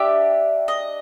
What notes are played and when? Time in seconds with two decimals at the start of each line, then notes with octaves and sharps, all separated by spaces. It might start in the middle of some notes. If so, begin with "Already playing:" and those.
Already playing: D4 G4 E5
0.68 D#5